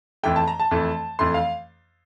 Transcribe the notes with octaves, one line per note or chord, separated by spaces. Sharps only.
F2 E3 A3 G5
A5
A#5
A5
F2 E3 A3
F2 E3 A3 C6
F5